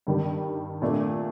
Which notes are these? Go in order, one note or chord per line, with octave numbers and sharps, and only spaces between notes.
G2 D#3 G3
A#2 A3 D4